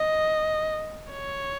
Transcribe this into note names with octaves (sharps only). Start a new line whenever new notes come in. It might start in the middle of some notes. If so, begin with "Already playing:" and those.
Already playing: D#5
C#5